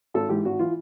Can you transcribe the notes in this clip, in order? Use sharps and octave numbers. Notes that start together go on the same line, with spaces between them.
G#1 A4
G#2 E3 G4
G#1 F#4
E3 F4